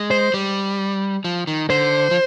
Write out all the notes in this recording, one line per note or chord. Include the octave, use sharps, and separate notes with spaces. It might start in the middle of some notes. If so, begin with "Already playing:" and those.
Already playing: G#3
C5
G3
F3
D#3
D3 C5
F3